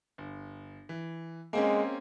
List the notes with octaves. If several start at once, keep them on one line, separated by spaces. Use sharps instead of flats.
G1
E3
G#3 A#3 C4 C#4